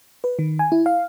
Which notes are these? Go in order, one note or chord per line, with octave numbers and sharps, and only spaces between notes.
B4
D#3
G#5
E4
F5